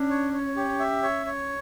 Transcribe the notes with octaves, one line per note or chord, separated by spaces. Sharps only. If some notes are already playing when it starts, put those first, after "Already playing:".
Already playing: C#4 D4
C#5
C#5
G4
E5
C#5
C#5